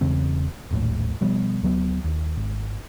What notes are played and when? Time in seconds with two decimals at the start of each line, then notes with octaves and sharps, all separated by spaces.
0.01 E1 E2 C#3 C4
0.71 D#1 A#1 A2
1.21 B2 F3 G3 B3
1.63 D2 F#3 B3
2.04 D#2
2.37 G#1